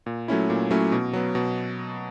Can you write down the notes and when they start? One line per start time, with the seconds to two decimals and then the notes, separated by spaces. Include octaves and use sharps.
0.06 A#2
0.28 F#3 A3 C#4 E4
0.50 A#2
0.71 F#3 A3 C#4 E4
0.92 B2
1.13 F#3 B3
1.35 B2